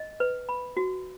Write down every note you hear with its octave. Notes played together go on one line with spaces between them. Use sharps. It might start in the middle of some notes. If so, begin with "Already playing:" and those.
Already playing: D#5
B4
B5
F#4